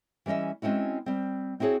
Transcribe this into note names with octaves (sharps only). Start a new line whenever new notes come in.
E3 G3 C#4 D#5 E5
G#3 C4 C#4 E4 F#4
G3 C4
C4 E4 F#4 G#4 C#5